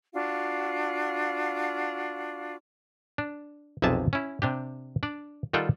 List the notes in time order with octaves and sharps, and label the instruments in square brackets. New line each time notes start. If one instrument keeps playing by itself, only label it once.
[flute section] D4 F4 F#4 F5
[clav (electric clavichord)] D4
B1 F2 C3 G#4 E5 A5
C#4 E4
C3 D4 G4
D4 D5
D#3 G3 F4 A4 F#5 G5